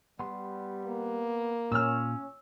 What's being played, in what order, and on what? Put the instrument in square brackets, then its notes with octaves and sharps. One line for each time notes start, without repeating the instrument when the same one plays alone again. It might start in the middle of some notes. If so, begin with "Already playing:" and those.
[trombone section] G3 [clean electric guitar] B3 C6
[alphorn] A#3
[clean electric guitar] A#2 F4 [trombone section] C#4 [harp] E6 F6